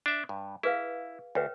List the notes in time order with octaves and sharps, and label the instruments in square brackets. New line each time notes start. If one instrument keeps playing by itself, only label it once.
[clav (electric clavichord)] D4 E5
G2
[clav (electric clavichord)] E4 [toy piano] G#4 B4 F5
[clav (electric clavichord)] D2 [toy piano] B4 C#5 G5